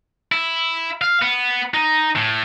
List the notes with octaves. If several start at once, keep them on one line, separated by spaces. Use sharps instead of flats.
E4
F5
B3
D#4
A2